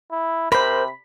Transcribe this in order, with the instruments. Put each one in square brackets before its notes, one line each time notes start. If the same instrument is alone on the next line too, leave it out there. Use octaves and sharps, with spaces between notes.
[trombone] E4
[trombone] C3 [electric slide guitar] A#4 C5 [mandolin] B5